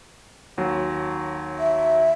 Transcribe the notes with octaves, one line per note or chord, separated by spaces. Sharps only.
D#2 F#3
E5